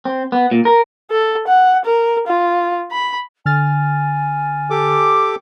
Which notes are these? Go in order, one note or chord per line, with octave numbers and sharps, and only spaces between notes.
C4
B3
A#2
A#4
A4
F#5
A#4
F4
B5
D3 G#5 F6 A6
G4 A4 D6